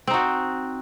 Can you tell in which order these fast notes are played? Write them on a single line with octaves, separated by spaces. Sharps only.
C4 D#4 F#4